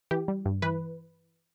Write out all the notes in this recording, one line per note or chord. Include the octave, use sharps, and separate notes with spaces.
E3 G4
G3
G2
E3 B4